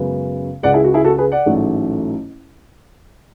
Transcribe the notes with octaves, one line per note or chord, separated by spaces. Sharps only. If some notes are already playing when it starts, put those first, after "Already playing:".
Already playing: F#2 C#3 G#3 B3
C#2 C#3 G#3 D5 F#5
E4 G#4
F#4
E4 G#4
F#4 A4
G#4 B4
D5 F#5
A1 G#2 F#3 A3